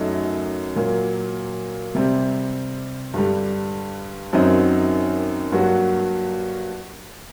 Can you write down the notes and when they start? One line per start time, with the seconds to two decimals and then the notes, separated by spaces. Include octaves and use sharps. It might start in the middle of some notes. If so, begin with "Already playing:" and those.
Already playing: F#2 F#3 A3 D#4
0.76 A#2 F#3 A#3
1.95 C3 G3 C4
3.14 G2 D3 G3
4.33 F#2 D#3 F#3 C4 D#4
5.52 G2 F#3 A#3 F#4